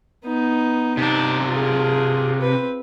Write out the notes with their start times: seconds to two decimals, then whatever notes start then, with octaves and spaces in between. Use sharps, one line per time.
0.25 B3 D#4
0.97 C3 D4 D#4 A5
1.49 F4 G#4
2.41 C4 B4